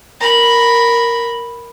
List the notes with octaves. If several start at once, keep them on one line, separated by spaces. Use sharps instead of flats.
A#4 B5